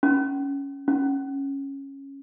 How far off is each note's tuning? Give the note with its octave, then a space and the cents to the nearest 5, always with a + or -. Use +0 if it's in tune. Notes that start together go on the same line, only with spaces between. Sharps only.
C#4 +5
C#4 -10